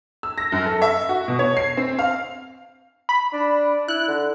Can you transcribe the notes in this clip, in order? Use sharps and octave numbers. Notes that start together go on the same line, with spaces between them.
E6
A#6
F#2
A4
E5
F#4
B2
C#5
C7
C4
F5
B5
D4
E4 F#6
D3